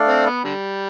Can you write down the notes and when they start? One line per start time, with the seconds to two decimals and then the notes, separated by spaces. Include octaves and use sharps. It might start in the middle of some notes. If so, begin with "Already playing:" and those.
Already playing: A3 D4 A4 D5 F5
0.08 C4
0.26 B3
0.44 D3 G3